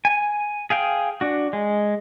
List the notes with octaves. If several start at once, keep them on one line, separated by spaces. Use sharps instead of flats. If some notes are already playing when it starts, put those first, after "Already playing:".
G#5
G#4 F5 G5
D4 F#4
G#3